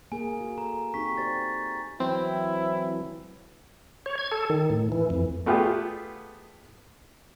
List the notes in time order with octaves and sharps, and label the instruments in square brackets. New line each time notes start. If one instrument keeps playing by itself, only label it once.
[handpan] A#3 G#4 A#4 [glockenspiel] G#5
[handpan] F#4
[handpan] A4 [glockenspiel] A#5
[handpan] C4 D#4 G4 [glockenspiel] C#6 B6
[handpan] G4 C5 D5 [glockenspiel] A6
[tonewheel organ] E3 F#3 [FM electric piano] C4 [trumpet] E4
[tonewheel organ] C#5
G#6
A4
D#3
A2
E3
F2
[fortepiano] A3 B3 F4 G4 G#4